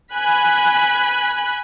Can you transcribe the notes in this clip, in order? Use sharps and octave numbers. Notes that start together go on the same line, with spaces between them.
G#5 B5 F#6